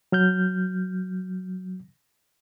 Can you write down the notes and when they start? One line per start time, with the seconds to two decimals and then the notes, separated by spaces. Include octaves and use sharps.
0.12 F#3 F6 G6